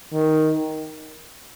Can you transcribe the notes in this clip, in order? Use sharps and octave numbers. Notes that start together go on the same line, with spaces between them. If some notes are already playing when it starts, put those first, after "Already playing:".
D#3